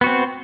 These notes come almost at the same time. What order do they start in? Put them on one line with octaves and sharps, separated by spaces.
B3 F#4 C4